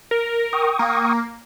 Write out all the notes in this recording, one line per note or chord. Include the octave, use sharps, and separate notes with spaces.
A#4
G5 C#6 D#6
A#3